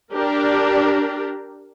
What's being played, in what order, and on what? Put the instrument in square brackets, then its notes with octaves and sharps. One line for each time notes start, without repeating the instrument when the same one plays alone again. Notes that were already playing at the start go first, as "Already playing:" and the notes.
[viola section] D4 G4 A#4